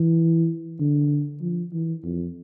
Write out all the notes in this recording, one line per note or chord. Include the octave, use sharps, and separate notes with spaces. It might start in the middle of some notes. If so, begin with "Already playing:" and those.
Already playing: E3
D3
F3
E3
F2